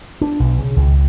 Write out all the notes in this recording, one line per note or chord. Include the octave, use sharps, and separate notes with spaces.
D4
B1
C#3
C#2